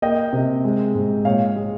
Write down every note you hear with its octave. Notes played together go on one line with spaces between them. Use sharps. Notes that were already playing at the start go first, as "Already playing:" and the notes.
A#3 D#5 G5
C3
G#3
G#2
A#2 C#5 F5
G#3